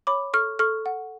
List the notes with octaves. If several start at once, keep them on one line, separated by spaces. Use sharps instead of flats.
C#5 B5 D6
A4 C#6 F6
A4 C#6 F6
F#5